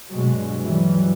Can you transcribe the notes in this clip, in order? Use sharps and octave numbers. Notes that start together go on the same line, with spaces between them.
G2 B2 F#3 G#3
E3 F#3 G3